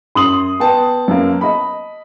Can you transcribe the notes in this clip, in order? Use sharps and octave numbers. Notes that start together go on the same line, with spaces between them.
F#2 C6 D#6 F#7
B3 G5 A5
F#2 A#3
D#5 B5